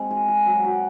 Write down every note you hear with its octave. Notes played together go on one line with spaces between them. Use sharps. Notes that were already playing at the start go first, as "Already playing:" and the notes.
Already playing: G#3 C4
G#4
G#4
F#3
F#4